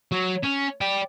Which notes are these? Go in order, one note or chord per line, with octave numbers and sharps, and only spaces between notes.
F#3
C#4
D5 G5